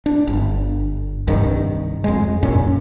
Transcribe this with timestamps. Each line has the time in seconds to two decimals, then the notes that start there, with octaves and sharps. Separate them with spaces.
0.06 D4
0.27 G1
1.27 C2 G2 D#3
2.04 F2 G#3
2.43 F#2 A#2 C#4